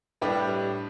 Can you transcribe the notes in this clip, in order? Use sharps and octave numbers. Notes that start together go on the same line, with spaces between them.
A2 G3 D4 G4 B4